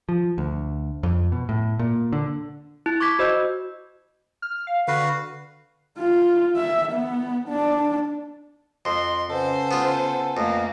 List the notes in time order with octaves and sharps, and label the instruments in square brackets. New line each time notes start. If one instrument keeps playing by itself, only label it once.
[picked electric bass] F3
D2
F2
B2
A2
A#2
D3
[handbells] E4
C#6 D6 G#6 B6
F#4 C5 D#5 E6 G6
[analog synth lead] F6
F5
[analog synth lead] D3 [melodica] F#4 B4 F5
[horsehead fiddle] F4
E5
B3
D4
[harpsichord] F2 [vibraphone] D#5 [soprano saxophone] C6
[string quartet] C#3 C5 [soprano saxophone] A4 [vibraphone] B4 F#5 G#5
[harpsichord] B3 F4
[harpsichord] F2 [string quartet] A3 A#3